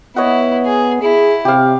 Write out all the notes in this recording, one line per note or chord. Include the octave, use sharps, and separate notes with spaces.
B3 E4 C#5 D#5 F#5
G#4
E4 G#4
C3 G4 F5